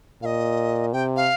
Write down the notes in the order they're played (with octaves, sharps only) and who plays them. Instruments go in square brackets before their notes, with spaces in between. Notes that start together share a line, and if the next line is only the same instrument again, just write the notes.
[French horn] A#2 [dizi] D#5 F5
[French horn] C3 [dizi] G5
[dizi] F5